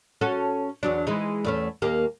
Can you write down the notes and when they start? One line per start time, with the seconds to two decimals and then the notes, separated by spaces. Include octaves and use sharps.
0.21 C#4 F#4 A4
0.83 E2 F#3 D4
1.07 E3 G#3 D#4
1.45 E2 A3 C#4
1.82 D#2 A#3 G4